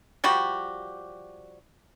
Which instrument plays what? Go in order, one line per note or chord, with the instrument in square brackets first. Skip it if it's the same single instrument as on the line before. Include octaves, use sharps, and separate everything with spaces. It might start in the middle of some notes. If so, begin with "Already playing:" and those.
[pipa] F3 G3 F#4 G4